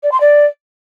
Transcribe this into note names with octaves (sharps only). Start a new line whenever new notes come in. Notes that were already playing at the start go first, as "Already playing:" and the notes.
D5
C6
D5